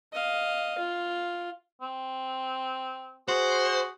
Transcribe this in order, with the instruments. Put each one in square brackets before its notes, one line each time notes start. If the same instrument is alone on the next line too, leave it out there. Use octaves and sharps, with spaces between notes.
[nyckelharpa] D#5 F5
F4
[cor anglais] C4
[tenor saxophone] F#4 [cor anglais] G#4 [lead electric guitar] C5